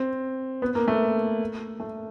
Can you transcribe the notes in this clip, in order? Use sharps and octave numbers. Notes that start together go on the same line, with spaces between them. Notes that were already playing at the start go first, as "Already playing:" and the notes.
Already playing: C4
B3
A#3
A3
A3